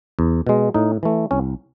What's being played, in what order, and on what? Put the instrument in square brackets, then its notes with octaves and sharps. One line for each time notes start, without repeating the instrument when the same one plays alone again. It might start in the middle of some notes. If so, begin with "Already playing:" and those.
[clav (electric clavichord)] E2
B2 G#3
A2 D#4
E3 A3
C2 C#4